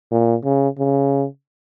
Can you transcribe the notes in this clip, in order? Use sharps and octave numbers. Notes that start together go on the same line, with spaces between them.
A#2
C#3
C#3